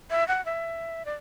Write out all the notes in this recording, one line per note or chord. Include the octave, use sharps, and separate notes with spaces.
E5
F#5
E5
D5